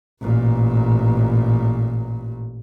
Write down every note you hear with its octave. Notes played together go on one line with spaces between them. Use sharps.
A1 A#2